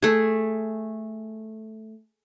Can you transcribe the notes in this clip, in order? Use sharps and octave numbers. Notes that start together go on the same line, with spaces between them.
A3 G#4